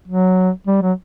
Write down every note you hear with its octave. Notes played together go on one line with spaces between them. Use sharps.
F#3
G3
F#3